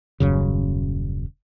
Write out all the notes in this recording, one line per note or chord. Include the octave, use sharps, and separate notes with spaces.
D#1 F#2 C#3